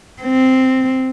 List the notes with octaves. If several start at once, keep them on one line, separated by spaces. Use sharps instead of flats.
C4